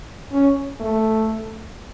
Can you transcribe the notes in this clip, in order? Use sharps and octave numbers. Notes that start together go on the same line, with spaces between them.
C#4
A3